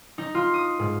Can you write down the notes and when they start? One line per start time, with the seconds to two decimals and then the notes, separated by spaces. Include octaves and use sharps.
0.18 D#4
0.35 F4
0.54 D#6
0.79 G#2